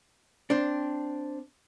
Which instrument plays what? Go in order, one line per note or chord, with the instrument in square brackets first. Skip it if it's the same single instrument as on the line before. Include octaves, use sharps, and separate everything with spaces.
[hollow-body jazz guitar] C4 D4